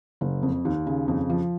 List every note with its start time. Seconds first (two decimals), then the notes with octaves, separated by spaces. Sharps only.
0.21 F#1
0.43 F2
0.65 D#2
0.87 C#3
1.08 F2
1.30 F3